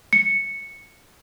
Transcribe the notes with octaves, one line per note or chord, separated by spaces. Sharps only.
C#7